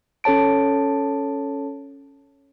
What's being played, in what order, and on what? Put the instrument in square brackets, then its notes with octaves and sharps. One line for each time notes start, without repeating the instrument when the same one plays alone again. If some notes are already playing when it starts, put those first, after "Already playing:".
[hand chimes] C#4 A4 C#5 A5 D7